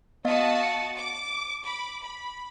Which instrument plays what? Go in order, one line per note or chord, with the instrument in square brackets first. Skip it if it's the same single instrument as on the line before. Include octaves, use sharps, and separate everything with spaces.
[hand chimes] B3 D#5 F5 [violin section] F#4 A5 D#6
[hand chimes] C#7
[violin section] D6
B5 D6
B5